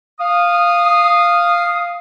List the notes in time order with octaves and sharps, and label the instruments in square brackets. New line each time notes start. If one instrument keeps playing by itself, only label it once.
[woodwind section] F5 D#6